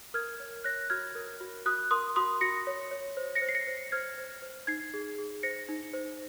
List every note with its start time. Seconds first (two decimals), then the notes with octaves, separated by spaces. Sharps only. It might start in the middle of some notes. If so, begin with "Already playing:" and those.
0.14 A#4 F6 G#6
0.40 C#5
0.64 C#5 F#6 A#6
0.90 F#4 F6 G#6
1.15 A#4
1.41 F#4
1.66 F#4 D#6 F#6
1.91 A#4 C6 D#6
2.16 F#4 C6 D#6
2.41 F#4 A#6 C#7
2.67 C#5
2.91 C#5
3.17 C5
3.35 A#6 C#7
3.42 C5
3.49 C7
3.55 A#6 C#7
3.67 C5
3.92 C5 F6 G#6
4.18 C5
4.42 C5
4.67 D#4 G#6 C7
4.94 G#4
5.18 G#4
5.43 C5 A#6 C#7
5.69 D#4
5.93 C5